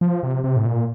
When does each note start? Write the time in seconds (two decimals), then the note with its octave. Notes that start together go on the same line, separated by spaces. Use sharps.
0.01 F3
0.23 C3
0.44 C3
0.56 A2
0.66 A#2